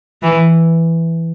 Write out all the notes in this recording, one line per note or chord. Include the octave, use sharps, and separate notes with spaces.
E3